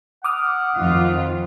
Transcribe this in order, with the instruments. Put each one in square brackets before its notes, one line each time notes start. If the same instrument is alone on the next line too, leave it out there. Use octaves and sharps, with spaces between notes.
[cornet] F#5 [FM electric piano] D6 D#6 F6
[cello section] F2 D#3 F4